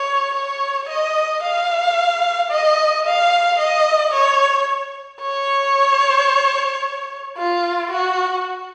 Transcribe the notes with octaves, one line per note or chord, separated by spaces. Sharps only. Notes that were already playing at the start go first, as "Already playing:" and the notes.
Already playing: C#5
C#5
D#5
F5
D#5
F5
D#5
C#5
C#5
F4
F#4